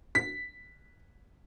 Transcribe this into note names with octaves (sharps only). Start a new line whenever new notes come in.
B6